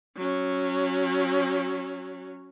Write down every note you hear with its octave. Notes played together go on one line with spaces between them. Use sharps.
F#3 C#4